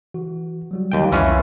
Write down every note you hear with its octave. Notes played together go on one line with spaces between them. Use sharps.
E3 F#4
F#3 G3 F#4
D#2 G5
C2 F2 E3 C#4 F4